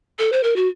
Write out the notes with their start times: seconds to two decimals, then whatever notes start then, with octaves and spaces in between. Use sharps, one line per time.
0.19 A4
0.32 C5
0.43 A#4
0.56 F#4